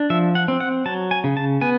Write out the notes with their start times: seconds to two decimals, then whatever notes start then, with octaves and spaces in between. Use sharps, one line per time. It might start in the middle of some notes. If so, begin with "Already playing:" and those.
Already playing: D4
0.10 F3 E5
0.35 F#5
0.48 C4
0.60 F#5
0.86 F#3 A5
1.11 G#5
1.24 C#3
1.37 A5
1.61 B3 G#5